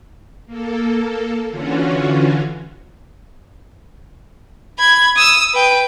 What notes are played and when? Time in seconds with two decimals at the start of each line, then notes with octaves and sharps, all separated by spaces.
0.46 A#3 A4
1.49 D3 E3 C#4 F4 F#4
4.79 B5 G#6
5.16 D#6 E6
5.54 B4 G5